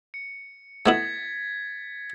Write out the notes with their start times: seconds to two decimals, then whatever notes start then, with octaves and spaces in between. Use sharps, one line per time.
0.14 C#7
0.86 A3 B3 E4 G#6 A6 B6